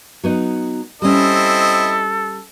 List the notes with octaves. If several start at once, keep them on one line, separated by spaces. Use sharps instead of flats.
F#3 B3 D#4
G3 C4 C#4 E4 A4 D#5